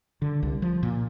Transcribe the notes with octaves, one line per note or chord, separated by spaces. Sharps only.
D3
C2
F3
A#2